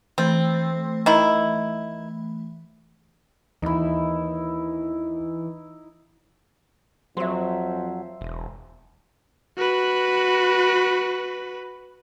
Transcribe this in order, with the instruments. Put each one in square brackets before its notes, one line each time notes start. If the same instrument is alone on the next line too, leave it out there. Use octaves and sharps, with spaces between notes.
[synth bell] E3 A3 [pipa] C4
[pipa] D#3 E4
[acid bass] D#2 [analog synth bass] E3 [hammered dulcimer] D#4 E4
[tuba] F2 [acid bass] F#3 [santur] C5 E5
[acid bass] E1
[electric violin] F#4 B4